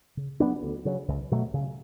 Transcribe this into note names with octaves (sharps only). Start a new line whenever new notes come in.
C#3
F#3 B3 D4
D2
C#3 F#3
C#2
B2 F#3 A3
C#3